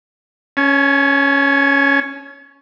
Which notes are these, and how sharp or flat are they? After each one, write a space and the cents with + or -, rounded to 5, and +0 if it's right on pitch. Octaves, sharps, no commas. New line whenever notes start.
C#4 +0 G#5 +45